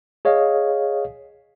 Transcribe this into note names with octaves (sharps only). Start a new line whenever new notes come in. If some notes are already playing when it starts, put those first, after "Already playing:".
G#4 C#5 D#5 F5